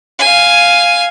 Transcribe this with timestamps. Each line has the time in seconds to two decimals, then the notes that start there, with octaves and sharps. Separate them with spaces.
0.19 F5 G#5